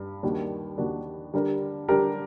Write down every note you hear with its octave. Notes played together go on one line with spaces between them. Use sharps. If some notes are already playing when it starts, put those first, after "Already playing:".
Already playing: G2
D#2 D#3 G3 D4 F#4
D#2 D#3 G3 D4 F#4
D3 G3 D4 G4 A#4
D3 G3 D4 G4 A#4